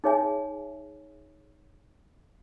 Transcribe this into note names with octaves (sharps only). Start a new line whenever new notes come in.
D#4 G#4 C#5 E5 G#5